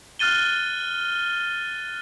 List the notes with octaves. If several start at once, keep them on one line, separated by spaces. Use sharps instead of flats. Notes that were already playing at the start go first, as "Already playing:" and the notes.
F6 F#6 A6 D#7 G7